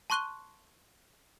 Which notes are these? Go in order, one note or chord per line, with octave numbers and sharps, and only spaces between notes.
A5 C6 C#6 F#6 D#7 G7